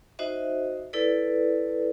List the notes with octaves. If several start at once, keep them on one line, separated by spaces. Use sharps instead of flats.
D#4 F#4 C5 D#5 E5
E4 A4 B4 D5